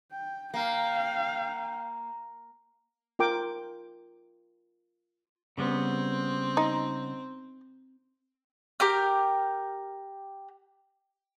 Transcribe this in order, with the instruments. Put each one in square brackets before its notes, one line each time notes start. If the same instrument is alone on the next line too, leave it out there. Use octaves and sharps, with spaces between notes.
[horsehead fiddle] G5
[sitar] A#3 [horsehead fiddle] F5 G5
[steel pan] F4 A#4 G5 D6
[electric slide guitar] C#3 G3 B3 [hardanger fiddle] C4
[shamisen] D#4
[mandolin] G4 A#4 G5 F6